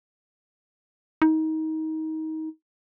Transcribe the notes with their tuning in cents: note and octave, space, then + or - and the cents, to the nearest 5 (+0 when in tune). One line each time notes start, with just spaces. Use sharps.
D#4 +25